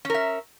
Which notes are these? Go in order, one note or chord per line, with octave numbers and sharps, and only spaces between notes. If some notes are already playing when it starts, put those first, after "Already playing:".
C#4 A#4 E5